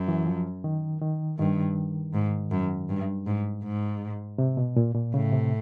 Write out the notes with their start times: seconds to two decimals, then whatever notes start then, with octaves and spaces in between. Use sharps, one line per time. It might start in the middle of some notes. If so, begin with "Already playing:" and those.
Already playing: F#2
0.08 E3
0.27 F3
0.64 D#3
1.02 D#3
1.39 G2 D#3
2.14 G#2
2.52 F#2
2.89 G2
3.26 G#2
3.64 G#2
4.38 C3
4.57 B2
4.76 A#2
4.95 A#2
5.14 A2 C#3
5.32 C3